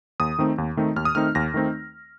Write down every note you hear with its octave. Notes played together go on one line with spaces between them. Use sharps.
D#2 D#6
D#3 A3 C4 D#4
D#2
D#3 A3 C4 D#4
D#2 F6
D#6
D#3 A3 C4 D#4 F6
D#2 A#6
D#3 A3 C4 D#4